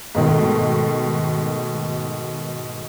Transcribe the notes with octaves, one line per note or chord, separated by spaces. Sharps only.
G#2 B2 D#3 A3